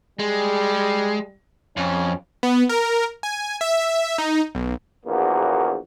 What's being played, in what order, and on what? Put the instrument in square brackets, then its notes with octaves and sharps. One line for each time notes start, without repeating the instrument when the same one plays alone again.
[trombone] G3 [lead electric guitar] G#3
[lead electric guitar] F2 [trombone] C#4
[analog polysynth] B3
A#4
G#5
E5
D#4
B1
[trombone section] A#1 E2 A#3 F#4